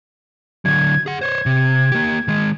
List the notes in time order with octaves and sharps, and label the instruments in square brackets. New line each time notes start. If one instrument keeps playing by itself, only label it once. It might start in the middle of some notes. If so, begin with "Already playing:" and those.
[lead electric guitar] D3 F#3 [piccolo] G#6
[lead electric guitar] G#4 F#5
[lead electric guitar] C5 C#5 [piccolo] G#6
[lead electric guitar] C3
A#3 G4
D#3 G#3